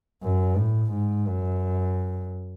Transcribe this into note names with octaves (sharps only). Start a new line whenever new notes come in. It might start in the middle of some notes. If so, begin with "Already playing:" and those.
F#2
A2
G#2
F#2